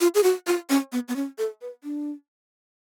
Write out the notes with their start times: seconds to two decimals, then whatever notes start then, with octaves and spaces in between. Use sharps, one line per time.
0.01 F4
0.15 G#4
0.23 F#4
0.47 F4
0.70 C#4
0.92 B3
1.08 B3
1.16 C#4
1.38 A4
1.61 B4
1.84 D4